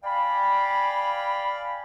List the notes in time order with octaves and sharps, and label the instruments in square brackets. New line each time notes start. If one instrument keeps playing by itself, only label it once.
[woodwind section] D5 F5 G5 G#5 B5